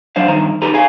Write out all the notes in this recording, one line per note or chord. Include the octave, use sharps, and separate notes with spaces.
F#3 D4 C5 F5
G2 D#3 A#5
D#4 G4 A4 B4 A#5
G#4 F5 G#5